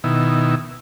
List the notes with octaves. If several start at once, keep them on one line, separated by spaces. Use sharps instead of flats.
B2 D#3 E4